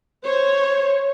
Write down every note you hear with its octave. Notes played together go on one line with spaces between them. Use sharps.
C5 C#5